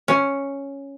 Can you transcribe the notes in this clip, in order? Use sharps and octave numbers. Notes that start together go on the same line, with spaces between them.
C#4